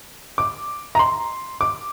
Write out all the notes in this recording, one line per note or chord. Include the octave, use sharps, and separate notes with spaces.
D6
A#5
C6
D6